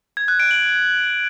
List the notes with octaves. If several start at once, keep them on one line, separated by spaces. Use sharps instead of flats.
G#6
F#6
D7
F#7